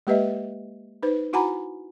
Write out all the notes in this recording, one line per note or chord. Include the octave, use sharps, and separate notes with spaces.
G#3 A#3 G4 B4 D#5 E5
D#4 B4 C5
E4 F#4 F#5 G#5 A#5 B5